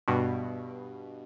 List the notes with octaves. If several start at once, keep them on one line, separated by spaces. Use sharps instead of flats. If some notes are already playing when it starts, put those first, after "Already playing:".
G2 B2